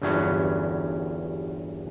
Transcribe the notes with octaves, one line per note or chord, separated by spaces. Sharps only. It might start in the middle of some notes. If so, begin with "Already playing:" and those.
G1 E2 G2 F#3 C#4 B4